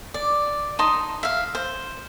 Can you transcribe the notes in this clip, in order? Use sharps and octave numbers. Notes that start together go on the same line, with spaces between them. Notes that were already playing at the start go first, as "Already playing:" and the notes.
D5
D#4 A5 C6 D#6
E5 F5
C5